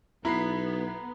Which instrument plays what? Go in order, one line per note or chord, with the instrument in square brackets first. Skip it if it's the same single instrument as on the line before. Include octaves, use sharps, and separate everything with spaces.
[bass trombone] B1 [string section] B3 [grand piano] E4 [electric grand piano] A#5 B5 C7